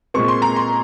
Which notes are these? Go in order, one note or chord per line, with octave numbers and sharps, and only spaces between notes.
A#2 G#3 C4 C#6
C6
A#5
C6